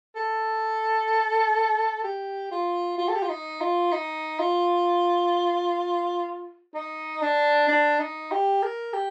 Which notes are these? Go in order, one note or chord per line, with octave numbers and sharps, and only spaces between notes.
A4
G4
F4
F4
A4
G4
F4
D#4
F4
D#4
F4
D#4
D4
D4
D#4
G4
A#4
G4